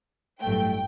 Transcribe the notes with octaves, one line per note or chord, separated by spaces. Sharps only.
A1 G2 F#3 A3 G5